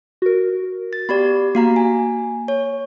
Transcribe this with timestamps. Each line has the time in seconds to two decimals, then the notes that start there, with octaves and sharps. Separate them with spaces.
0.22 F#4 A#4
0.93 A6
1.09 B3 G4 D5 B5
1.55 A#3 F#4 F5 A#5
1.76 G#5
2.48 C#5